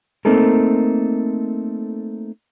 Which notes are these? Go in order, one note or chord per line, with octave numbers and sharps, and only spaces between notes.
A3 A#3 C4 D#4 A4 A#4